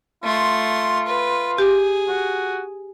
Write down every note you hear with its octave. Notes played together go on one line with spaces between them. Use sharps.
A3 F4 C6
B4
G4 G#4
F#4